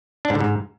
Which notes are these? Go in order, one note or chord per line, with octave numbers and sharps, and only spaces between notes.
D4
G#2
D3
G#2